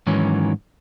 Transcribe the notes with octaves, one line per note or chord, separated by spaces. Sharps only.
G#2 D#3 E3 F#3 C#4